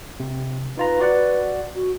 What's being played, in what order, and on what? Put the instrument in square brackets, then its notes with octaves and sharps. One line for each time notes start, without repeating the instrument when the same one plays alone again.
[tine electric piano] C3
[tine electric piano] D#4 F4 A#5 [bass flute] B4
[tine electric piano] F#4 D5 F#5
[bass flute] F#4